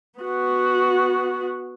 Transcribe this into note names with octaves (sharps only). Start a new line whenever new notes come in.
B3 F#4